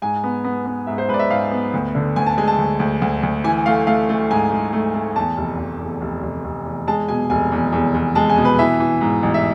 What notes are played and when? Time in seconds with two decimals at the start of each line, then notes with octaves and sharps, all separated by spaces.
0.02 G#2 G#5
0.24 B3
0.44 B3
0.66 B3
0.87 G#2 E5
0.98 C5
1.09 G#2 B4
1.14 D5
1.19 E5
1.30 G#2 F5
1.51 B3
1.74 D2
1.95 D3
2.16 D2 G#5
2.27 A5
2.38 G#3 G#5
2.48 A5
2.58 D2
2.80 D2
3.02 D2
3.23 D2
3.44 E3 G#5
3.66 A3 F5
3.87 A3 F5
4.09 A3
4.30 G#2 G#5
4.52 G#2
4.73 A3
4.94 A3
5.16 E2 A5
5.37 F1
5.58 F1
5.80 E2
6.01 F1
6.23 F1
6.44 F1
6.66 E2
6.87 G#3 A5
7.08 B2 G#5
7.30 F1 G#5
7.52 E2
7.72 E2
7.94 E2
8.15 G#3 A5
8.29 G#5
8.38 B2
8.45 B4
8.59 E3 E5
8.80 E3
9.01 G#2
9.23 A1
9.34 E5